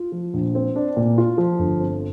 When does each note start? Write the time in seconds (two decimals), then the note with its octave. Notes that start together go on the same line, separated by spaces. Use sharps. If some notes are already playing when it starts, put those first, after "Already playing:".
Already playing: F4
0.12 F3
0.34 A#1
0.55 C4
0.76 D4
0.97 A#2
1.18 F4
1.38 F3
1.59 G1
1.80 C4